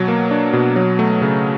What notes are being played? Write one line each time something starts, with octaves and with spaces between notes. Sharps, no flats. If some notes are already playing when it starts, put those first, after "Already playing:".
Already playing: B2 F#3
A#3
D4
B2
F#3
A3
C#3